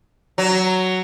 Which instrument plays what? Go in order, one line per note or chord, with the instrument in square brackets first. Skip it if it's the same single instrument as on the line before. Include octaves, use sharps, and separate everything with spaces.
[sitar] F#3